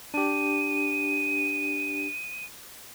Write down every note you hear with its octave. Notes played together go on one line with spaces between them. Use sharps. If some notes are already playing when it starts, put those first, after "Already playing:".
D4 G4 D#7